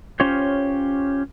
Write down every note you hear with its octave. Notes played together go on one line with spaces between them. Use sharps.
C#4 F4 G4 C5 C#5